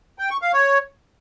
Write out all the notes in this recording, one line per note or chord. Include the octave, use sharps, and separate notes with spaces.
G5
C#6
F5
C#5